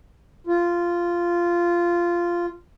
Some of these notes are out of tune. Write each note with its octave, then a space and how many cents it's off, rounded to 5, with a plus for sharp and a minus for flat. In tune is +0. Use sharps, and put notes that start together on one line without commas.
F4 -10